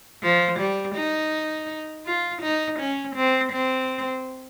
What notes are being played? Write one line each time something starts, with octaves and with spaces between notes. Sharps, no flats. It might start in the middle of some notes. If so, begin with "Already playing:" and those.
F3
G3
D#4
F4
D#4
C#4
C4
C4